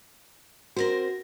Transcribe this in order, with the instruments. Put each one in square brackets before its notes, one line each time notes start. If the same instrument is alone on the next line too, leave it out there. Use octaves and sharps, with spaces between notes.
[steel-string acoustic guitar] C4 A#4 C5 [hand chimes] F#4 A#6